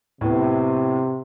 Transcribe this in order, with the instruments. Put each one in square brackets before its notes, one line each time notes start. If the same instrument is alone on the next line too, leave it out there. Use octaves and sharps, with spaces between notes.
[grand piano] A2 B3 [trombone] C3